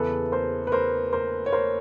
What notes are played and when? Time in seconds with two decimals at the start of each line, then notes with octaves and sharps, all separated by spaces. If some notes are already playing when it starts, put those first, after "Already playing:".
Already playing: E2 C#3 E3 A4 B4
0.32 A#4 C5
0.67 B4
0.72 A#4 C5
1.13 A#4 C5
1.46 C#5
1.53 A#4 C5